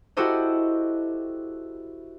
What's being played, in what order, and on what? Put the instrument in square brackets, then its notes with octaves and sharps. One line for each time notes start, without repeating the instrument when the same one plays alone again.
[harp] E4 F#4 G4 A4 C5 D#5